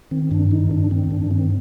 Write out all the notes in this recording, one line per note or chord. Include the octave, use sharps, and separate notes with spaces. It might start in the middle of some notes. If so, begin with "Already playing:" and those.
D#3 C4
G2 D4
D#3 D#4
G2 D4
D#3 C4
G2 D4
D#3 C4